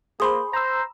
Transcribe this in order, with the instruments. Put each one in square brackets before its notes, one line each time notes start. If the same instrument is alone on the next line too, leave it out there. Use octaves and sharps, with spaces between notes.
[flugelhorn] A#3 [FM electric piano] G#4 C5 [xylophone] B5 C6 D#6
[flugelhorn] C5 [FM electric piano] A#5 E6